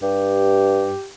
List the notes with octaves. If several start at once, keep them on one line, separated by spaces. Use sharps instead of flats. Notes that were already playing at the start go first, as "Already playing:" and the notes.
G2 G4